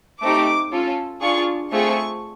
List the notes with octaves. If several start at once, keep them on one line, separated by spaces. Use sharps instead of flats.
A3 C4 D#4 G4 D6
C#4 F4 A4
D4 F4 G#4 C#6
A3 C4 F4 G#4 C#6